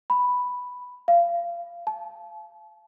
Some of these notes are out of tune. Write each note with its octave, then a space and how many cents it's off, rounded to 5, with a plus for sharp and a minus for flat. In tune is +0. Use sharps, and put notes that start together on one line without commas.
B5 +0
F5 -25
A5 -35